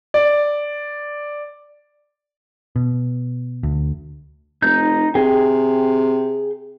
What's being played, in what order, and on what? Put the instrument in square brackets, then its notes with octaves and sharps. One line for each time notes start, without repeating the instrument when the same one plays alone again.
[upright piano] D5
[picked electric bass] B2
D2
[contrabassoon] F1 [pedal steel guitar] D#4 G6
[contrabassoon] C3 [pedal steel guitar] G#4 G5